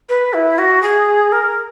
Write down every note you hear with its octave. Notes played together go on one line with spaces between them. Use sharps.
B4
E4
F#4
G#4
A#4